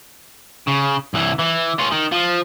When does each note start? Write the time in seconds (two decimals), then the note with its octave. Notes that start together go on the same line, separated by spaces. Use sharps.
0.68 C#3
1.14 C2 E3
1.39 E3
1.79 C#4 F4
1.92 D#3
2.12 F3